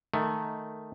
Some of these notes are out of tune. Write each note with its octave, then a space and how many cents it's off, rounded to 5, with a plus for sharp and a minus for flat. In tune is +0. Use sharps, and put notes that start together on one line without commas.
D#3 +0 A3 +0